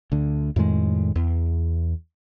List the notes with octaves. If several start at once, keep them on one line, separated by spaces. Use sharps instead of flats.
D2 D3
F2 A2 D#3 G#3
E2